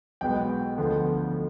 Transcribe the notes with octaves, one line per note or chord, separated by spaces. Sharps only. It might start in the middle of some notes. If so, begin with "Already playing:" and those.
B1 B2 G#3 B3 G5
D2 D3 F3 B3